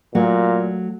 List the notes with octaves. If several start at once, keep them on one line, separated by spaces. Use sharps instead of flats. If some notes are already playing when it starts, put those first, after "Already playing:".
A#2 F#3 A3